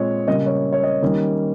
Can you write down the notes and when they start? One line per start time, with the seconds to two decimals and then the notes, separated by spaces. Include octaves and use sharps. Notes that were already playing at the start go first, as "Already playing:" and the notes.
Already playing: A#2 G#3 C4 C#5 D#5
0.27 C#3 G3 A#3 D#5
0.46 C#5
0.73 C#5
0.83 D#5
1.02 D#3 G3 A#3 C#4